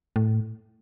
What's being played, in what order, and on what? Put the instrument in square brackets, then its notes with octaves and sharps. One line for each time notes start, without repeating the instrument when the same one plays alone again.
[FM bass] A2